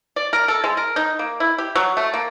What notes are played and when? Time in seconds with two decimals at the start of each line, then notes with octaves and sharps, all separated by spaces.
0.16 D5
0.33 A#4
0.48 A4
0.64 G#3
0.77 A#4
0.96 D#4
1.19 A#3
1.40 E4
1.58 G4
1.75 F#3
1.97 A3
2.14 A#3